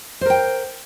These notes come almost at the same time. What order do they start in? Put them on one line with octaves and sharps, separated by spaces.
C5 A#4 G5